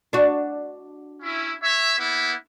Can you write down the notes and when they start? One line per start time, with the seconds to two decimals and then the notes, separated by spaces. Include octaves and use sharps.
0.13 D4 F#4
1.23 C#4 E4
1.63 C#5 E5
1.98 A#3 B3 E4